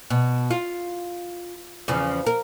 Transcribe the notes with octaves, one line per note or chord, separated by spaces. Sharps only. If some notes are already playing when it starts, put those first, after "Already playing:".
B2
F4
E2 C#3 F3
A#4